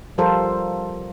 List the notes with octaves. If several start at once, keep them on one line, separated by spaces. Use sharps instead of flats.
F3 G3 F4 A4 A#4 C5